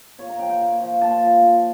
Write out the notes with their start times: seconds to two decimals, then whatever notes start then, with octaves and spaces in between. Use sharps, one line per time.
0.19 A#2 C#5
0.29 A#5
0.39 F3 G5
0.49 G5
0.60 A#2
0.80 F3
1.01 A#2 A5
1.22 F3
1.42 A#2